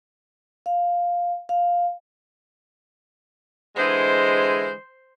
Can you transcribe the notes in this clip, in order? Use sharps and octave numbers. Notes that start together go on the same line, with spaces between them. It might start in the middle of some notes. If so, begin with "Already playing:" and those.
F5
F5
D3 E3 G#3 C5